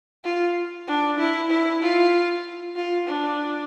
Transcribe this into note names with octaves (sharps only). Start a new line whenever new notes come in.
F4
D4
E4
E4
F4
F4
D4